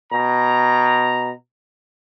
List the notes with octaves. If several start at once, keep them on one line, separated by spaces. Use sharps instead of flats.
B2 A#5